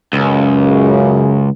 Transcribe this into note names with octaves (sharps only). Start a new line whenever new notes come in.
C#2 F#2 C#3